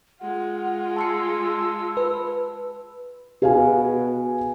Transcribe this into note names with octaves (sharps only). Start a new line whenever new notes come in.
G#3 F4 F#5
A5 C6 E6 C#7
B4
B2 G#4 F5 G#5